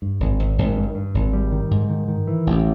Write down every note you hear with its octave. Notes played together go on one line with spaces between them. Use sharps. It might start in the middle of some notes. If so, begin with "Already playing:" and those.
G2
G#1
G#1
G#1
G2
G2
G#1
G3
D#3
G#2
D#3
D#3
E3
A1